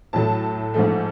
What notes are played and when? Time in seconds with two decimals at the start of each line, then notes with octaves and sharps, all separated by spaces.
0.13 A2 F#3 A3 A5
0.74 G#2 F3 A3